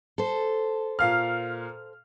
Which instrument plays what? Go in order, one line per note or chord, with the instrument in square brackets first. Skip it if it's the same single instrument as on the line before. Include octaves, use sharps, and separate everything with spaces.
[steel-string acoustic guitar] A4 C5
[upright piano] A#2 F5 F6